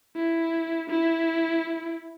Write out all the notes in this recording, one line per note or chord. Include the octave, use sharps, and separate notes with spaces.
E4
E4